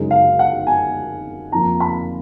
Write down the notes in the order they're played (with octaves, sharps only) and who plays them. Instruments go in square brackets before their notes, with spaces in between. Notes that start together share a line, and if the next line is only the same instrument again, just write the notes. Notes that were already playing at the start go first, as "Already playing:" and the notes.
Already playing: [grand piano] F#2 C#3 G#3 D#4
F5
F#5
G#5
F2 F3 A#3 A#5
B5